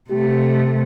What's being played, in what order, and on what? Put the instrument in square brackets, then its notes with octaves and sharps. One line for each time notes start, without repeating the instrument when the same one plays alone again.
[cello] C3 A3 [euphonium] G4